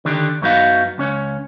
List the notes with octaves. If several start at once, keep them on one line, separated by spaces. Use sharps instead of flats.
D3 D#3 D4 G4
F#2 F#3 B3 D#4 F#4 F5
C#2 C#4 C#5